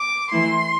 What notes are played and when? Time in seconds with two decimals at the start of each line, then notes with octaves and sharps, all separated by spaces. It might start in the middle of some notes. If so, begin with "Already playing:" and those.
Already playing: D6
0.31 E3 A3 E4 C6